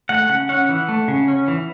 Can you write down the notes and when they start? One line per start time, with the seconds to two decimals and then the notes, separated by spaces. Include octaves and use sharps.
0.09 A3 F#5
0.29 C#3 F#5
0.49 C#4 F#5
0.69 E3
0.89 A3
1.08 C#3
1.28 C#4
1.48 E3